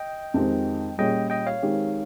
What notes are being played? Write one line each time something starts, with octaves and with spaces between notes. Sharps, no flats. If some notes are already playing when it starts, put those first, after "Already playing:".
Already playing: D#5 G5
F2 D#3 G#3 C4 G4
A#2 G3 C#4 G#4 D#5 G5
D#5 G5
C#5 F5
D#3 G#3 C4 G4